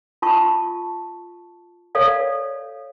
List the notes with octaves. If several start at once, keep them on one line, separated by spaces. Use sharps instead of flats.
F4 A5 C#6
A4 C#5 D5 F5